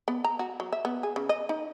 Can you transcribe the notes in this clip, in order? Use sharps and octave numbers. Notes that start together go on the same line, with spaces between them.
B3
A#5
F#4
F#3
E5
B3
G#4
C#3
D#5
D#4